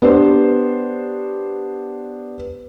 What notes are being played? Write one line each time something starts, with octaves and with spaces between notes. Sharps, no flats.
B3 D4 G4 C5